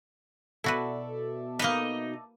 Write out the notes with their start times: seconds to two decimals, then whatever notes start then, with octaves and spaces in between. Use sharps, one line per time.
0.64 B2 E4 F#4 A4 B4 D5 E5
1.59 A#3 D#4 B4 D#5